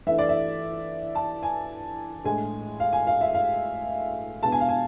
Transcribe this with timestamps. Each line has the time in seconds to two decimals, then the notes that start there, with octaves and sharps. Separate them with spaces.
0.07 E3 A3 D4 E5
0.19 D5
0.29 E5
1.15 A5
1.43 G#5
2.24 A2 G#3 D4 G#5
2.80 F5
2.93 G#5
3.07 F5
3.21 E5
3.35 F5
4.43 B2 G#3 B3 D4 A5
4.52 G#5
4.61 F5
4.69 G#5